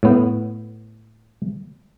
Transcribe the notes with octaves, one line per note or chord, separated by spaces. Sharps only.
A2 B3